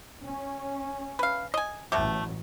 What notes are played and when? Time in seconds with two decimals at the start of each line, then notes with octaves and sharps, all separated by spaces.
0.23 C#4
1.19 B4 F5
1.54 D#5 G#5
1.92 A1 B2 F#3 A3 G4